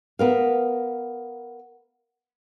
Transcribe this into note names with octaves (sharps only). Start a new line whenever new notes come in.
B3 A#4 F5